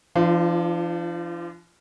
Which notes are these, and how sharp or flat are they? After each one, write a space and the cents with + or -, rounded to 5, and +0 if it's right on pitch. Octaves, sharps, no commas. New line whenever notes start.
F3 -40 D4 +10 F4 +0